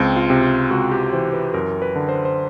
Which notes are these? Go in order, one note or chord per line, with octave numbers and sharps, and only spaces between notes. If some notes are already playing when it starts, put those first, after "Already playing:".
Already playing: C#2 C4
F4
C3
F4
C#2 F#4
G4
E3 C5
B4
F#2 A#4
B4
D3
C5
C5